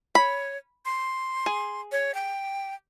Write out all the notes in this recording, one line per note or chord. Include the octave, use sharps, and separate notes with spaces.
C#5 B5
C6
G#4
C#5
G5